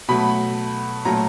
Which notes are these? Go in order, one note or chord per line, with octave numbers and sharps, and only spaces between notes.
B2 F#3 A3 B5
A#2 F#3 A3 A#5